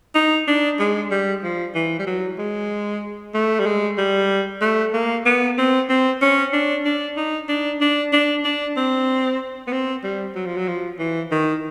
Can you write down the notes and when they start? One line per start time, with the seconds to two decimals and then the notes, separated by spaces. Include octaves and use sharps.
0.15 D#4
0.47 D4
0.79 G#3
1.11 G3
1.43 F3
1.75 E3
1.99 G3
2.06 F#3
2.38 G#3
3.34 A3
3.59 G3
3.66 G#3
3.98 G3
4.61 A3
4.94 A#3
5.26 B3
5.58 C4
5.89 C4
6.22 C#4
6.53 D4
6.85 D4
7.17 D#4
7.48 D4
7.81 D4
8.13 D4
8.44 D4
8.77 C4
9.67 B3
9.72 C4
10.04 G3
10.36 F#3
10.46 F3
10.56 F#3
10.68 F3
10.99 E3
11.31 D#3